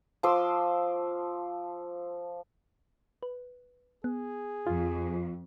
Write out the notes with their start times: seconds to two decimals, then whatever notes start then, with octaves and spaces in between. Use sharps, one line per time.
0.23 F3 C6 D6 E6
3.23 B4
4.04 B3 G#4
4.67 F2 F4